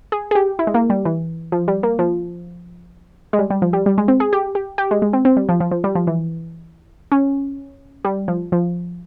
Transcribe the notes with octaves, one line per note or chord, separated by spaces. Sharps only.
G#4
G#4
G4
E4
G#3
A#3
G3
E3
F3
G3
A#3
F3
G#3
G3
G3
F3
G3
G3
G#3
C4
G#4
G4
G4
G4
G#3
G#3
C4
C4
G3
F3
F3
F3
G3
F3
E3
C#4
G3
F3
F3